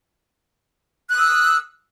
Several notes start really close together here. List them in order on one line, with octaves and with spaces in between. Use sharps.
F#6 D#6 E6